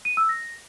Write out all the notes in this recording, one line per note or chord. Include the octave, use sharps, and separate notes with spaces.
D#7
E6
A#6